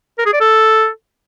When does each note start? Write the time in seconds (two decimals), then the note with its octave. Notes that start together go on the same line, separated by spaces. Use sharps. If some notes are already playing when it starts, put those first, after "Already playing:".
0.18 A#4
0.26 G#4
0.33 D5
0.40 A4